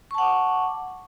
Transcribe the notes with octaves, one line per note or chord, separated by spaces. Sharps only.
F#5 A5 C#6 D6